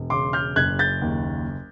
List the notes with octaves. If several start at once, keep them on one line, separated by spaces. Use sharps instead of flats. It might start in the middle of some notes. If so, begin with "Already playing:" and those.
Already playing: E1
C#3 C6 D6
F6 G6
F#1 F#6 G#6
G6 A6
D#2